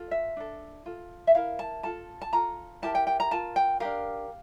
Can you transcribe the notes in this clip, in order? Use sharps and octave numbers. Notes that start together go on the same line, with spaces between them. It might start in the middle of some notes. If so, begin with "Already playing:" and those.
Already playing: F4 A4
E5
D4 A4
F4 A4
E5
E4 A#4 F5
A5
F4 A4 A5
A5
F4 A4 A#5
E4 G4 A#4 A5
G5
G5
A#5
F4 A#4 A5
G5
D4 G4 A#4 F5